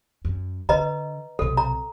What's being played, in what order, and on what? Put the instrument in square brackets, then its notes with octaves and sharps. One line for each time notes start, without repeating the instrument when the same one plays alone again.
[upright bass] F#2
[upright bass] D3 [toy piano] B4 D#5 A#5
[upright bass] B1 C3 [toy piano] A4
[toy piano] A#5